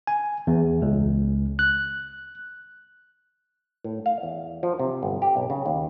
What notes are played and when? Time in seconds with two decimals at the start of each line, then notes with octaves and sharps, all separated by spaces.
0.07 G#5
0.47 E2
0.82 C#2
1.59 F#6
3.84 A2
4.06 F5
4.23 E2
4.63 F3
4.79 C3
5.03 G1
5.22 G4
5.37 B1
5.50 C#3
5.66 D#2